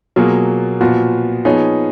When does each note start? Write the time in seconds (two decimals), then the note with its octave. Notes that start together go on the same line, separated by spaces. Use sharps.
0.16 B2 F#3 A#3 F4 G#4
0.81 A#2 F3 B3 F#4
1.45 F3 B3 D#4 G#4 C#5